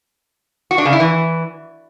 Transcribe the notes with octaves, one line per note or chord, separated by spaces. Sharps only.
F#4
D4
C#3
E4
E3